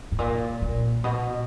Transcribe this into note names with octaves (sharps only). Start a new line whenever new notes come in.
A2
A#2
A#2
B2